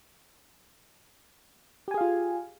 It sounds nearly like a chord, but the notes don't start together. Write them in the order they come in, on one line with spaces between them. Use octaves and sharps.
G4 G#5 G#4 F5 F4